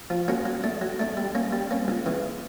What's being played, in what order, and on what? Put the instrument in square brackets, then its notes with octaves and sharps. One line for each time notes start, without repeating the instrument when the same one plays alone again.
[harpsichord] F3
A#3 C#4 F#4 A#4
F#3
A3 D4
F#3
A3 D4
G3
A#3 C#4
G3
A#3 C#4
C#2
C#3 E3